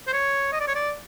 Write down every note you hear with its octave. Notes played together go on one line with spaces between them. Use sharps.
C5
C#5
D#5
D5
C#5
D5